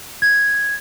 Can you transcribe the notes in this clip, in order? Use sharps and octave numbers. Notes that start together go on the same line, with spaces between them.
G#6